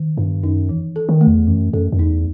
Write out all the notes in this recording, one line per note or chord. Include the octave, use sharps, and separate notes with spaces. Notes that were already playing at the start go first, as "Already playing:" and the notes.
Already playing: D#3
G2 B3
F#2 D#4
E3
A4
D#3
A3
E2
F#2 E3
F#2 A4
F#2
E2 D#4